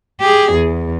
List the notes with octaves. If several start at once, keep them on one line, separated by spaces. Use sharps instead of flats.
G4 G#4
E2